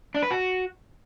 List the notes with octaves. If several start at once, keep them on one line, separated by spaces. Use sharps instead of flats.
D4
B4
F#4